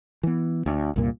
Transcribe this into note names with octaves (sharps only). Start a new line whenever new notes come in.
E3 B3
D2
C2 G2 A#2 A#3